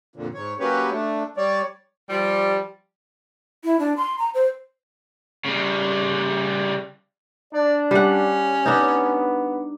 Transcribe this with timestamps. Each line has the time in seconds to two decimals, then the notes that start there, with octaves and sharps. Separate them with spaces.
0.16 F2 A#2 D3
0.34 G#2 C#5
0.60 F#3 A#3 C#4 G4 B4 C#5
0.91 A3 D4
1.37 G3 C#5 D5
2.09 F3 G3
3.64 E4
3.79 D4
3.97 C6
4.18 A#5
4.34 C5
5.45 C#3 G3
7.53 D4 D5
7.91 G3 C#4 F#5
8.66 B3 D4 D#4